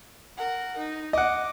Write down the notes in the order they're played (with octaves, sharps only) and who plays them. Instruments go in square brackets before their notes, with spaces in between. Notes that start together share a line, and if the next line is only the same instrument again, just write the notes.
[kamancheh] A#4 F#5
D#4
[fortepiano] D#5 F#5 [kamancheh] D6